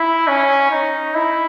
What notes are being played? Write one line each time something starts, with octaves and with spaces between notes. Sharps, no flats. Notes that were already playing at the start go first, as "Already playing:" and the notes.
Already playing: E4
C#4
D#4
E4